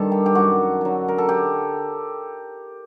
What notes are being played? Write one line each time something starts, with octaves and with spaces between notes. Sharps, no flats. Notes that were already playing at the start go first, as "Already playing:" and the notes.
Already playing: G2 D#3 G3 A4
G4
G4
F#2 F#4
D3 F#3
A#4
A4
G4